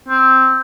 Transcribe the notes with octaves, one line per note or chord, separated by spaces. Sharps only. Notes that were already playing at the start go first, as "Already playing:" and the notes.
C4